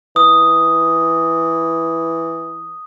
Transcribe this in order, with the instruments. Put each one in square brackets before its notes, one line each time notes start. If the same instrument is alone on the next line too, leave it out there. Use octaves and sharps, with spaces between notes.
[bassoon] E3 [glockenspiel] D#6